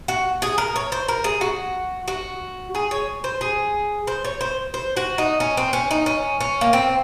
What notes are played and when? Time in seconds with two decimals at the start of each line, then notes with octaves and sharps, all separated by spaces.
0.08 F#4
0.42 G#4
0.58 A#4
0.76 C#5
0.92 C5
1.08 A#4
1.24 G#4
1.41 F#4
2.08 F#4
2.75 G#4
2.91 C#5
3.24 C5
3.41 G#4
4.07 C5
4.25 C#5
4.41 C5
4.74 C5
4.96 F#4
5.18 D#4
5.40 C#4
5.57 C4
5.73 C#4
5.91 D#4
6.06 C#4
6.40 C#4
6.61 A#3
6.73 C4